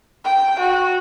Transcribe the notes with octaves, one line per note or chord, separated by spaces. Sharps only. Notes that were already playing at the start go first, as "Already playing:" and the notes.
G5
F#4